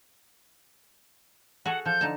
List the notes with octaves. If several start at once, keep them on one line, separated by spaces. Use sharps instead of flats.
F#4 G#4 A4 F#5
F3 A4 G6
D3 D#4 A5